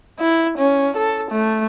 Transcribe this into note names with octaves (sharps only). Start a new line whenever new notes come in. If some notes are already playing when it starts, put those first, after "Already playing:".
E4
C#4
A4
A3